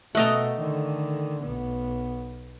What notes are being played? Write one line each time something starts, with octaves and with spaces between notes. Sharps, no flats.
B2 A3 A4 D#5 F#5 G5 A#5
D3 D#3
B1 B3